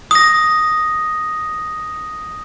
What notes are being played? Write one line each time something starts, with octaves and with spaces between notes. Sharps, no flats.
D#6 A#6